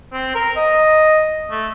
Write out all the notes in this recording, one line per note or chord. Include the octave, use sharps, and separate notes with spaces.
C4
A#4
D#5
A3